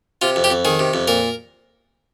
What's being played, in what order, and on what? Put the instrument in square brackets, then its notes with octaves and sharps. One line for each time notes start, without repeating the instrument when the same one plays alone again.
[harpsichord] C3 F4
F2
G4
F2
D#3 G#4
C3
F2
A#2 A#4